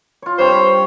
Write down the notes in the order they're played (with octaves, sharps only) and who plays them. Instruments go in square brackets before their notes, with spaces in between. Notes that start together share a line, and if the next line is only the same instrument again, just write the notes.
[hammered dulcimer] F4 C#5
[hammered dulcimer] G2 C4 [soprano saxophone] C5 [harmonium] C#5
[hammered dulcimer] B5